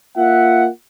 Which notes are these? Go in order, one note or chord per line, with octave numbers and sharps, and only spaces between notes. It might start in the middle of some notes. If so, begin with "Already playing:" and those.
A#3 F4 E5 F#5